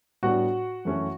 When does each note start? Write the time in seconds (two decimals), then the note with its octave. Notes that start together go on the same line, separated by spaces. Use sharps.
0.23 A2 G3 B3 D4 F#4 F#5
0.85 F#2 E3 A3 C#4